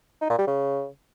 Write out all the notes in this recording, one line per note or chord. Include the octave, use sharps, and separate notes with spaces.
D#4
A#2
G3
C#3